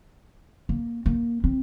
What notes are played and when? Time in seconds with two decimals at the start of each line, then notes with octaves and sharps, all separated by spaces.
0.69 A#3
1.06 A#3
1.44 C4